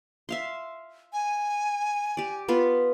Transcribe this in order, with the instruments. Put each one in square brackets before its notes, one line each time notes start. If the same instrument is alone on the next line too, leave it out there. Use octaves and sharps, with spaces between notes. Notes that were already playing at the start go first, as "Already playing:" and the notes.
[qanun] E5 F5 C6
[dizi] G#5
[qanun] G4 D5
B3 F4 B4